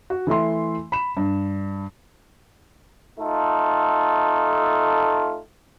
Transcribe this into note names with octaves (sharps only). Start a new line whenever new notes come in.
F#4
E3 A3 E5 C6
B5 E7
G2
A3 D#4 F4 A4